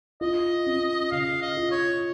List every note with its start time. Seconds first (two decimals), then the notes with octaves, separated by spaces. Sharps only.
0.21 F4 D#5
0.66 C#4
1.12 C#3 F5
1.42 D#5
1.57 F4
1.72 C#5